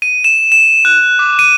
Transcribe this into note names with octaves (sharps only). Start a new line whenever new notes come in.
D#7
E7
E7
F#6
D6
D#7